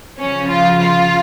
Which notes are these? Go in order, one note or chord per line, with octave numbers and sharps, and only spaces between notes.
C#3 F3 C#4
F4
F4